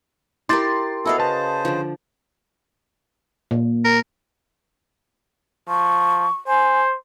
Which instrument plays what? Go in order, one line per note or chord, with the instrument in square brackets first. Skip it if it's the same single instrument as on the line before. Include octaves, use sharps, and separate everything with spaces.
[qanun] E4 G4 A#4 [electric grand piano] C6 D6 A6
[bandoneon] B3 E4 A4 [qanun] F#4 D#5 F5
[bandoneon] C#3 C5 [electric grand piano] B4 A5
[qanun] D3 F3
[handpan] A#2
[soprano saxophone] A#4
[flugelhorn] F3 [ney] C#6
[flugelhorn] C5 [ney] G#5